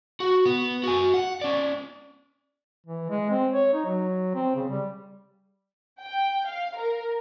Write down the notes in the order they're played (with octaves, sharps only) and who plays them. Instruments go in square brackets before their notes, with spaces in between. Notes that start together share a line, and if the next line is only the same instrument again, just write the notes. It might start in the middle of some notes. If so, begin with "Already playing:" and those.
[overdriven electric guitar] F#4
B3
F#4 G#5
F#5
C#4 D5
[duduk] E3
G#3
C4
C#5
D#4
F#3
C4
C#3
G3
[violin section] G5
F5
A#4